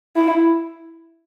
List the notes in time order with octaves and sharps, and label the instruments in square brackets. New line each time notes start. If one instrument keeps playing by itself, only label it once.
[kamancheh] E4